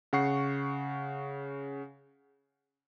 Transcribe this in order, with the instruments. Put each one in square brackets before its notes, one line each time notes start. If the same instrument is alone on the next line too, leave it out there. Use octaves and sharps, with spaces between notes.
[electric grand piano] C#3 F#5 C#6 C7